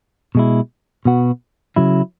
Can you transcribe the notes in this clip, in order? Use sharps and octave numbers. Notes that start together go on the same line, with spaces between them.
B2 G#3 E4
B2 B3 F#4
C#3 F#3 E4